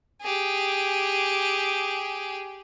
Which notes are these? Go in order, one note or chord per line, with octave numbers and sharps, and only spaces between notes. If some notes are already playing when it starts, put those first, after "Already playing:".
G4 G#4